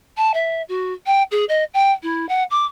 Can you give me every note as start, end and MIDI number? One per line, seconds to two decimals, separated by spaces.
0.17 0.31 81
0.34 0.62 76
0.68 0.93 66
1.06 1.22 79
1.31 1.44 68
1.49 1.64 75
1.74 1.91 79
2.03 2.28 64
2.28 2.43 78
2.50 2.65 86